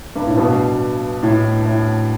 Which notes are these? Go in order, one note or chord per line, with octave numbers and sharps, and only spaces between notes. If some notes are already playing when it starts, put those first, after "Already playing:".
G2
A2
G2 B2
A2
A2